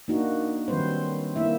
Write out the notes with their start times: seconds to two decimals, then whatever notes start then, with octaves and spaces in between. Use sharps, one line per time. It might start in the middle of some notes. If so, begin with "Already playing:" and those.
0.08 A#3 D4 D#4 F#4
0.68 D#3 F#3 G3 C4 B4 C5
1.36 A#3 E4 E5